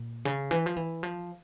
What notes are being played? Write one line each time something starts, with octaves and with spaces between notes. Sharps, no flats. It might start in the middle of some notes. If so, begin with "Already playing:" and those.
Already playing: A#2
C#3
E3
F3
E3
F3